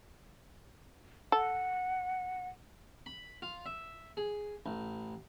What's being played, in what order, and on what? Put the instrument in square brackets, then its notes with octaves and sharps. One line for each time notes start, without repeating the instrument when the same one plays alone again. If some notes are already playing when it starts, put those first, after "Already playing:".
[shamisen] A4 [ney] F#5
[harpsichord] B5
F4
E5
G#4
A1